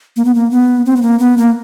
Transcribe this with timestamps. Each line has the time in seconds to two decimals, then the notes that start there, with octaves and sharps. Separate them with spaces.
0.16 A#3
0.25 B3
0.35 A#3
0.51 B3
0.86 C4
0.96 B3
1.02 A#3
1.19 B3
1.38 A#3